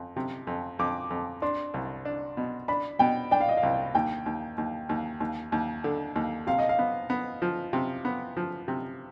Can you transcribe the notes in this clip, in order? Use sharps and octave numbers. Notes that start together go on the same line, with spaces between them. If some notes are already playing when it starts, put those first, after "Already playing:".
Already playing: F2
C3
F2
F2 D6
F2
D4 C6
C2
D4
B2
D4 B5
B2 G5
D4 G5
F5
D#5
F5
C2
D#2 G5
D#2
D#2
D#2
D#2
D#2
D3
D#2
C3 F5
D#5
F5
B3
B3
F3
C3
B3
F3
C3